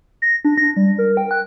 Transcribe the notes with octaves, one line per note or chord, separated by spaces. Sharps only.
A#6
D4
A#6
G3
A#4
G5
F#6